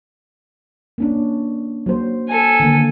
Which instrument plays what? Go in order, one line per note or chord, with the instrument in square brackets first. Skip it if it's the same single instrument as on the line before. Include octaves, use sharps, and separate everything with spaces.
[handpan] A#3 C#4 D4
F#3 A#3 C5
[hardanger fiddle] A4 G#5
[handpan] D3 D#3 A#3